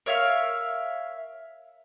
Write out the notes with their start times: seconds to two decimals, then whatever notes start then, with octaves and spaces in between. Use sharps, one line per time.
0.06 A#4 C#5 E5 F5